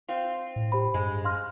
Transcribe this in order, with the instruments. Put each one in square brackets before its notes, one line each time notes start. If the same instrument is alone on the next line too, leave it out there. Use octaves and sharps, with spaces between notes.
[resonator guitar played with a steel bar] C4 F4
[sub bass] A2
[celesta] G4 C5 B5
[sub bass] G2 [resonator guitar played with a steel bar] G#3
[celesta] F5 C6 F6